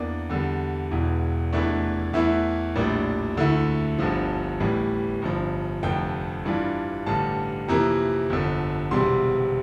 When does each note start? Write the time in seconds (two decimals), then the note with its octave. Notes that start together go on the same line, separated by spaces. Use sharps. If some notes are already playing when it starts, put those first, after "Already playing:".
Already playing: E2 E3 A#3 D4 D5
0.30 E2 D3 G3
0.91 E1 E2 E3
1.52 F1 E2 E3 A3 D4
2.13 E2 E3 A3 E4 E5
2.76 A#1 A2 G3 A#3 D4
3.37 D2 D3 A3 E4
3.99 G1 G2 D3 F3
4.60 A1 A2 E3 G3
5.22 G1 G2 F3
5.83 F1 F2 D3 F3 G5
6.45 G2 E3 G3 D4 F4
7.06 A1 G2 D3 A5
7.68 F2 C3 E3 A#3 A#5
8.30 G1 F2 D3
8.91 E1 E2 C3 G3 C6